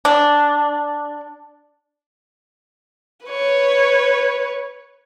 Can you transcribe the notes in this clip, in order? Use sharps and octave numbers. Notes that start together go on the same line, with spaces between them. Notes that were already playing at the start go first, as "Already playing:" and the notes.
D4
B4 C#5